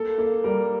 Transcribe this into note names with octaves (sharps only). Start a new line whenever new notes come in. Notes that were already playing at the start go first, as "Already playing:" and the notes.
Already playing: A#3 A4
A#3
G3 A#4